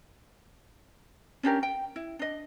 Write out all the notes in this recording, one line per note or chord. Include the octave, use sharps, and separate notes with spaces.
C#4 D4 G4 A#4
G5
E4
D4 D#5